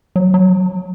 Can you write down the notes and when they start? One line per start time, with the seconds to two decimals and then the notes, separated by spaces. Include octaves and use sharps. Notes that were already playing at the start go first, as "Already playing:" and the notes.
0.16 F#3
0.34 F#3